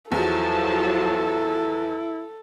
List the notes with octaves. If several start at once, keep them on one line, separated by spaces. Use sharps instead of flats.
E2 F3 F#3 E4 A4 A5